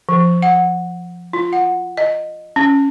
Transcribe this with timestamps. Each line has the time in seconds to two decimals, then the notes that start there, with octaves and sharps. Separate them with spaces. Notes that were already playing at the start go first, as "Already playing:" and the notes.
0.09 F3
0.42 F#5
1.33 F4
1.53 F#5
1.97 D#5
2.56 C#4